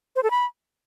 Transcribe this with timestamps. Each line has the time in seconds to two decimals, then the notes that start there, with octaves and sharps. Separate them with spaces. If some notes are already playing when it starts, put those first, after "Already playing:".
0.16 C5
0.23 A4
0.31 B5